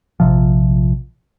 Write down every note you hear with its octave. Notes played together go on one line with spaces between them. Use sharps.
A#1 C3 F3